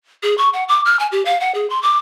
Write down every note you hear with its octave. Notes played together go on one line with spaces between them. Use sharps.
G#4
C#6
F#5
D6
F6
G#5
G4
F5
F#5
G#4
C6
D6